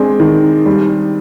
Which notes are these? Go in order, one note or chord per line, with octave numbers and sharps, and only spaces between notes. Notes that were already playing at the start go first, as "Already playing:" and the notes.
Already playing: G#3 C4 D4
D#3
G3